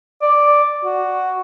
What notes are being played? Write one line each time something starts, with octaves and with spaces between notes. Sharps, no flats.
D5
F#4